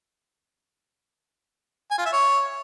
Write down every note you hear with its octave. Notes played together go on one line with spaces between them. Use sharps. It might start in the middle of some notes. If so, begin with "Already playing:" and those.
G#5
F4
E5
C#5